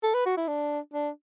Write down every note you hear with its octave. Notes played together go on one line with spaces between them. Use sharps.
A4
B4
F#4
E4
D4
D4